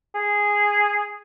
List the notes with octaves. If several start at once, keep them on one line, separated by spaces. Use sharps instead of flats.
G#4